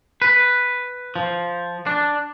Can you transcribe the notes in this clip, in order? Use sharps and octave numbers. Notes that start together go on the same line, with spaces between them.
B4
F3
D4